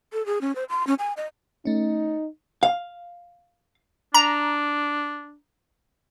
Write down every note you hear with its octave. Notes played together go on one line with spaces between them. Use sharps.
A4
G#4
C#4
C5
C6
C#4
G#5
D#5
A3 C#4 D#4
F5
D4 A#5